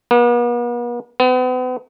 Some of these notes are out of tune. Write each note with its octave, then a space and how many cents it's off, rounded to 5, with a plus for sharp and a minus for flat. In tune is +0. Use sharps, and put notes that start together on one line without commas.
B3 -45
B3 +40